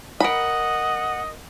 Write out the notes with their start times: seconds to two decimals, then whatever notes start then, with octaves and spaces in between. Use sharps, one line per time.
0.20 A#4 D#5 F#5 B5